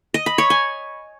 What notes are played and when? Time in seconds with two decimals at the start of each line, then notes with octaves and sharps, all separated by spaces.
0.14 D#5
0.26 B5
0.38 C#5
0.50 G#5